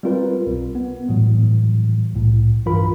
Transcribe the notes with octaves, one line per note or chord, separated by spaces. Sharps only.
G3 C4 F4 A#4 B4
B1
B3
A2 E3 F#3 G3
C2 A2
B1 G2 E3 F4 A#4 B5